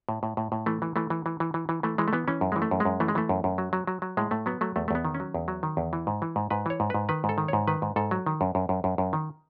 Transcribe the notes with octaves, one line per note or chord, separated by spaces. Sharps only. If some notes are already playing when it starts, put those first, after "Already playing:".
A2
A2
A2
A2
E3 A3
E3
E3 A3
E3
E3
E3
E3
E3
E3 A3
E3 G#3
A3
E3 B3
E3 C#4
F#2
G#3
E3
A3
F#2
G#3
F#2
E3 A3
G#3
E3 A3
F#2
F#2
F#3
F#3
F#3
F#3
A2 G#3
A2 A3
F#3 B3
F#3 A3
E2 A3
A3
E2 B3
D#3
C#4
F#3
E2
F#3
D#3
E2
E3
G#2
E3
G#2
G#2 B4
E3 C#5
G#2
G#2 B4
D#3 B4
G#2
A4
D#3
G#2 C#5
D#3 B4
G#2
G#2 A4
F#3
D#3
F#2
F#2
F#2
F#2
F#2
D#3